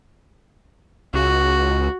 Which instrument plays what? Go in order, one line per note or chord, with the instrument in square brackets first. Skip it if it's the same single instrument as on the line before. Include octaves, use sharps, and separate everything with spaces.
[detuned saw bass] C#2 [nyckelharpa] F#4